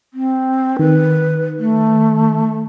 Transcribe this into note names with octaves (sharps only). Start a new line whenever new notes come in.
C4
D#3 B4
A3